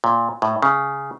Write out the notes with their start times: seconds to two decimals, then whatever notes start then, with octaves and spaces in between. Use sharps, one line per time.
0.04 A#2
0.42 A2
0.62 C#3